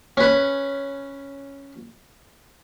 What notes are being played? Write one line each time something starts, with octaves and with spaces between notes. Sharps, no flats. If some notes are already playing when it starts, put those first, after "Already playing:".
C#4 B4